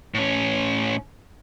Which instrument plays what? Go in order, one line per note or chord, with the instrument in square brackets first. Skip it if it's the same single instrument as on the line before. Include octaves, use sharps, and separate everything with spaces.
[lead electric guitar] A2 C#4